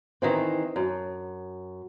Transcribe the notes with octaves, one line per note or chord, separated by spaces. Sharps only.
D#3 E3 C4
F#2